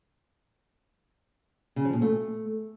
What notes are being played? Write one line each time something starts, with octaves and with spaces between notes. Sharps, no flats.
C#3
F3
A#2
A3